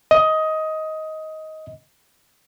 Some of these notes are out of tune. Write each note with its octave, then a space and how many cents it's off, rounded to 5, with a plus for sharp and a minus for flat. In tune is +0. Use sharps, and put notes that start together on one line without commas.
D#5 +15